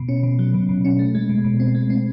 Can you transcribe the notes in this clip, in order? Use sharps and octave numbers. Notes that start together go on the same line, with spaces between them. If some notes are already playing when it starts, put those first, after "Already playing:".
Already playing: B2
C#4
B2
F#3
B2
B2
C#4
A3
G#3
B2
B2
C4
G#3
C4